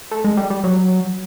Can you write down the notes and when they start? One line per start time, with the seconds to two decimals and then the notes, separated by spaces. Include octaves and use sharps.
0.11 A3
0.24 G#3
0.37 G3
0.50 G3
0.64 F#3